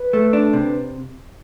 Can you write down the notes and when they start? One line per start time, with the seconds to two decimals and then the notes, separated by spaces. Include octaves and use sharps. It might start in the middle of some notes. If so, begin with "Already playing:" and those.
Already playing: B4
0.13 A3
0.33 D4
0.53 C3